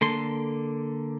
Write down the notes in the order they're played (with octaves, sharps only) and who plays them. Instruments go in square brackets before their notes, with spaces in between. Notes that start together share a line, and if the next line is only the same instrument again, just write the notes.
[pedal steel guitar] D3 A#3 A4 C6